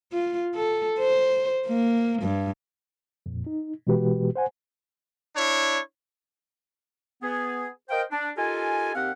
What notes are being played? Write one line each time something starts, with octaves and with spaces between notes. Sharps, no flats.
F4
A4
C5
A#3
G2
F2 A#2
D#4
B2 E3 G#3 F#4 G4 B4
C5 F#5 G#5
D4 E4 C#5
B3 G#4
A#4 C5 D#5 F5 G5
D4
D#4 F4 G4 A4 A#4 G#5
D#2 C4 G4 F5 F#5